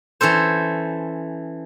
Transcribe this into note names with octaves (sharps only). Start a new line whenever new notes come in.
E3 C#4 A4 C5